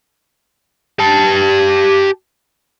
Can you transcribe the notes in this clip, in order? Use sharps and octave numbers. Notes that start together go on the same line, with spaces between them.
G4 A5